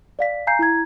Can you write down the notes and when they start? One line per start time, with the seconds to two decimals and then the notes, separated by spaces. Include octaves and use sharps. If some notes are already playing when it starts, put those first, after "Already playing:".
0.19 D5 F5 B6
0.47 F5 G#5 A#5 G6 C7
0.59 E4 A#5 G#6